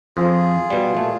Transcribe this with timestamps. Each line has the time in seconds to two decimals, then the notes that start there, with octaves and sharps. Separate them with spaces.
0.17 F2 F3 F4 G#4
0.70 B2 G3
0.94 A#2 A3